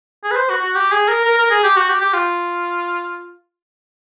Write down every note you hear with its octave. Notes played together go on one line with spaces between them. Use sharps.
G#4
B4
C5
F#4
F#4
G4
G#4
A#4
A#4
A#4
G#4
G4
F#4
G4
G4
F4